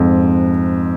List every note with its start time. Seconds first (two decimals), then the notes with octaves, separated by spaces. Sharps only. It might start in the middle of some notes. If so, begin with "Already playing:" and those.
Already playing: F2 G#2